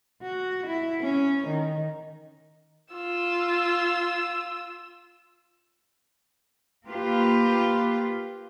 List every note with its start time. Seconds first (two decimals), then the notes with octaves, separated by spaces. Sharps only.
0.22 F#4
0.67 E4
1.00 C#4
1.47 D#3
2.94 F4 E6
6.86 A#3 F4 G4 B4